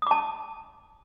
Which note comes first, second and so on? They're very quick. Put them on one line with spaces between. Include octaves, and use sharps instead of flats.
D#6 D6 A5